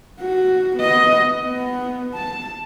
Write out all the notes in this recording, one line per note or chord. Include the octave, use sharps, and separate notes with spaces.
F#4
B3 D#5
B3
A5